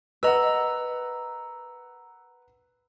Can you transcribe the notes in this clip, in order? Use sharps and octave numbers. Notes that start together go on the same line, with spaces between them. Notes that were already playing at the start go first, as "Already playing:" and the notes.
A#4 B4 D#5 F#5 A#5 E6